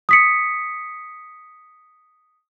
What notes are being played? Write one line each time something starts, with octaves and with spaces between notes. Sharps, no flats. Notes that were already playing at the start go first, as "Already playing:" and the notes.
D#6 B6 C#7